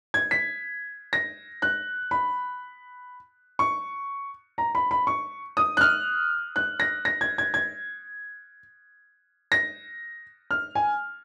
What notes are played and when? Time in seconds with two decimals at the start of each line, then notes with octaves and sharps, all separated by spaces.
0.14 G#6
0.31 B6
1.13 A#6
1.62 F#6
2.11 B5
3.59 C#6
4.58 A#5
4.75 B5
4.91 B5
5.07 C#6
5.57 D#6
5.77 F#6
5.81 F6
6.56 F#6
6.80 A#6
7.05 A#6
7.21 G#6
7.38 G#6
7.54 G#6
9.52 A#6
10.51 F6
10.75 G#5